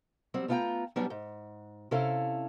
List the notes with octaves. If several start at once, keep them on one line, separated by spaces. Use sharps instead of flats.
F#3 G3 C4
A3 B3 F4 D5 G5 A#5
F#3 G3 B3 C#4 D4
G#2
C3 C#4 E4 A4 F5